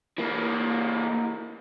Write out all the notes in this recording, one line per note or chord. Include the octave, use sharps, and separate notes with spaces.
E3 A#3